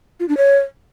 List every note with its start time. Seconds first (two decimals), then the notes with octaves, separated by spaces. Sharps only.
0.20 F4
0.29 D4
0.37 C#5